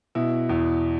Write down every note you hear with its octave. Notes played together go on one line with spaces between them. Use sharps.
B2 E4
E2